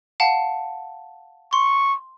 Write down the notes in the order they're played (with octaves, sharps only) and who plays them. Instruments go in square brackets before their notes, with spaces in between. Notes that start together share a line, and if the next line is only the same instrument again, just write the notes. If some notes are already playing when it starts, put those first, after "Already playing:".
[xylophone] F5 F#5 A5
[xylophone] C6 [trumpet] C#6